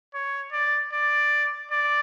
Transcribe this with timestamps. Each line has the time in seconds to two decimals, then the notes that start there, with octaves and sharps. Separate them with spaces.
0.14 C#5
0.53 D5
0.93 D5
1.71 D5